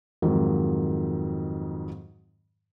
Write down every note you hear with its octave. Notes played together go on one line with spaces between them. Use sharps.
F2 G#2 D#3 F#3